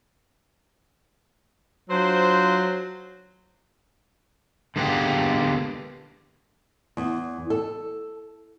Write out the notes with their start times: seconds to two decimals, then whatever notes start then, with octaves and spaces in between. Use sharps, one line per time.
1.89 F#3 D4 F4 C5
4.76 D3 G#3 A#3 B3 D4 G4
6.97 E2
7.50 A4